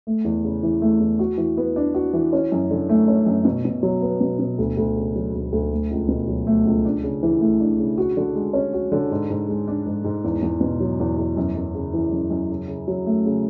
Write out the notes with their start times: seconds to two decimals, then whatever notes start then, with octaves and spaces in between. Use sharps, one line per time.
0.07 A3
0.24 E2
0.45 C#3
0.63 E3
0.82 A3
1.00 E2
1.19 F#4
1.38 E3
1.57 B3
1.76 D4
1.94 F#4
2.13 E3
2.33 C#4
2.52 F#2
2.71 D3
2.89 A3
3.08 C#4
3.26 F#2
3.45 B2
3.65 B2
3.83 F#3
4.02 B3
4.21 B2
4.39 B2
4.58 D2
4.77 D2
4.97 C#3
5.15 F#3
5.34 D2
5.52 D2
5.72 A3
5.91 C#2
6.08 B2
6.27 F#3
6.47 A3
6.65 C#2
6.85 D4
7.03 C#3
7.23 E3
7.41 A3
7.60 D4
7.79 C#3
7.98 F#4
8.17 D3
8.35 G#3
8.53 C#4
8.73 F#4
8.92 D3
9.11 G#2
9.30 G#2
9.49 G#3
9.68 D4
9.86 G#2
10.04 G#2
10.24 E2
10.42 E2
10.61 B2
10.80 F#3
10.99 E2
11.18 E2
11.37 F#2
11.55 F#2
11.75 C#3
11.93 E3
12.12 F#2
12.30 F#2
12.50 C#3
12.68 C#3
12.88 F#3
13.06 A3
13.26 C#3